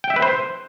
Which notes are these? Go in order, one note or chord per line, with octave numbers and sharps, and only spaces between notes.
G5
E5
B4
C5